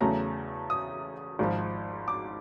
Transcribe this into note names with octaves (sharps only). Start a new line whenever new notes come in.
E2 C#3 F#3 A3 A#5
D#6
G#1 G#2 F3
D6